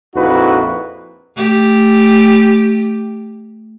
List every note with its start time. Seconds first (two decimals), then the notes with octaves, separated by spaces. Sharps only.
0.15 A#1 F2 D#4 E4 F#4 B4
1.35 A3 G4